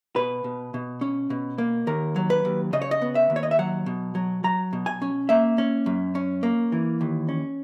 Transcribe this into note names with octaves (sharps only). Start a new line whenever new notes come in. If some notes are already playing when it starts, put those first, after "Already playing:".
B2 B4
B2
B2
C#4
B2
A#3
D#2 A#4
F#3
B4
D#2
C#3 D#5
C#5
D#5
B3
E5
D#2
C#5
D#5
E5
F#3 F#5
B2
F#3
F#3 A#5
B2
G#5
C#4
A#3 E5
C#4
F#2
C#4
A#3
E3
D#2
C#4